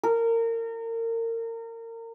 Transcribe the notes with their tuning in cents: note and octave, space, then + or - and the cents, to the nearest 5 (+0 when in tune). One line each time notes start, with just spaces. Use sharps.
A#4 -30